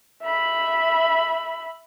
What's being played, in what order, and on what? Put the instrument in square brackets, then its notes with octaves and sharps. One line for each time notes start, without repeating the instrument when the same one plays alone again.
[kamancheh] E5 B5